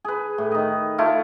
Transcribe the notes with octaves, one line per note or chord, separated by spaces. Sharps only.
G#4 B4
A2
D#3 D#5
A3 E4 F4